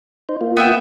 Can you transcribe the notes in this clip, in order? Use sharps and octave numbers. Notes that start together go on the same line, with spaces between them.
D#4 C5
A#3 F4
B3 E5 G5